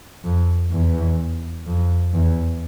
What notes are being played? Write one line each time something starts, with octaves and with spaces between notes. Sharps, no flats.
F2
E2
F2
E2